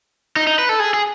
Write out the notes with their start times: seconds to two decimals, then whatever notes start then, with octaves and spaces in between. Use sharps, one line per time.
0.36 D#4
0.47 D#4
0.59 B4
0.69 A4
0.80 G#4
0.94 G#4